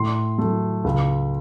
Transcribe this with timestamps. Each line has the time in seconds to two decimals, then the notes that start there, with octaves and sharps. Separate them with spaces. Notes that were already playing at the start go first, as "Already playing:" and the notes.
Already playing: A2 C6
0.38 F#3 A3
0.84 C#2